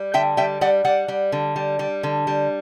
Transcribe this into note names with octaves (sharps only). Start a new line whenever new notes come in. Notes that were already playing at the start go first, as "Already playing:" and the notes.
Already playing: G3
D3 E5 G5
G3 E5 G5
G3 D5 F#5
G3 D5 F#5
G3
D3
G3
G3
D3
G3